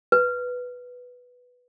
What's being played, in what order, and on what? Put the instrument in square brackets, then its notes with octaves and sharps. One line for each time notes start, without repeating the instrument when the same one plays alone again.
[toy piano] B4